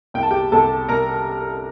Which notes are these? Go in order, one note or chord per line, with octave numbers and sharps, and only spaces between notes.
C2 G5
A5
G4 G5
C2 A4 A5
C2 A#4 A#5